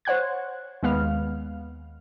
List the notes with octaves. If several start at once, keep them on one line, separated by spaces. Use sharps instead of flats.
C5 C#5 F#5 F#6 G#6
D#2 G#3 B3 F5 F6